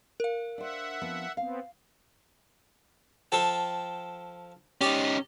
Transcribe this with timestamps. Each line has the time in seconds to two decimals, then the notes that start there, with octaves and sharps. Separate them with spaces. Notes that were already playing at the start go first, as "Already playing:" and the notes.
0.20 A#4 F5
0.58 D4 C5 E5 F#5
1.01 F3 B3 C4
1.37 B3 C4 F5
3.32 F3 A4 G5
4.81 C#4 D#4 G4 D5